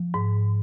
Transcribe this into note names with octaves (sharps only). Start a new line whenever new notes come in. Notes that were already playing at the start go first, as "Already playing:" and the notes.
Already playing: F3
G#2